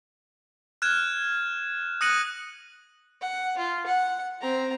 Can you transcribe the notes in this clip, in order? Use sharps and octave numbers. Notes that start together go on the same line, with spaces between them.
F6 F#6 G#6 E7
D#6 F#6 A#6 C#7 D#7 F#7
F#5
F4
F#5
C4 A#5